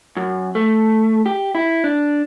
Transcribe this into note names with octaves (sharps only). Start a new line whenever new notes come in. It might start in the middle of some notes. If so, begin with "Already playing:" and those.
F#2
A3
G4
E4
D4